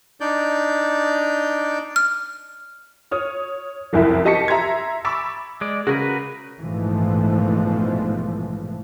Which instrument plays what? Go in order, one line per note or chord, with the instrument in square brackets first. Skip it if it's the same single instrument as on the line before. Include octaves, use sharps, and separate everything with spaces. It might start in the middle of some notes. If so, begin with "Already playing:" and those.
[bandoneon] D4 D#4 D5 G6
[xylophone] F6
[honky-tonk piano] C#5 D#6 F6
F#1 C2 F2 E4 A#4 E5
G4 D#5 A5 C#6 B6 C#7
E5 A#5 C6 G#6
B5 C#6 D6 E6 A6
[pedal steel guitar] G#3 D5
[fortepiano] C#3 [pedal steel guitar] F#4 A#4 B4
[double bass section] A#1 G#2 B2 E3 F3 A3